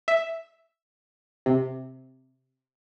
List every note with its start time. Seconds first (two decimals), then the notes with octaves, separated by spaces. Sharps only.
0.08 E5
1.46 C3